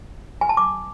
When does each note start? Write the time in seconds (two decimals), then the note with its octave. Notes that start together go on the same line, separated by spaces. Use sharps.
0.41 G#5
0.49 A5
0.57 D6